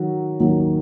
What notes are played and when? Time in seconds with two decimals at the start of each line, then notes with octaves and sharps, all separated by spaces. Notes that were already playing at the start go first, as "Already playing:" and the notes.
Already playing: D#3 F#3 F#4
0.39 D#2 D#3 F#3